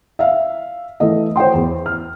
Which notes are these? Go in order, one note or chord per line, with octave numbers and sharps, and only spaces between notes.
E5 F5
E3 A3 D#5
C5 C#5 G5 C6
E2
F6